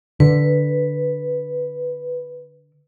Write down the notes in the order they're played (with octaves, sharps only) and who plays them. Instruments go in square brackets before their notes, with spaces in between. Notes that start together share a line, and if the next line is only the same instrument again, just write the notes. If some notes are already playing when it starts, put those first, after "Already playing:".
[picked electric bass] D3 [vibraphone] B4